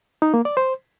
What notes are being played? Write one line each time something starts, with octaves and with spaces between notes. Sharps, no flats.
D#4
A#3
D5
C5